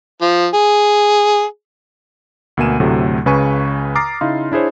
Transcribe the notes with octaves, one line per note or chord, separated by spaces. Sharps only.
F3
G#4
D2 B2 A#3 G#5 D#7 E7
D2 A2 C3 F#3 A3
C#2 C#3 B4 G#5 C#6 D#7
A#5 D6 D#6 F6 A6 C7
C#3 D#4 E4 F5 C6
D4 E4 G#4 C5 C#5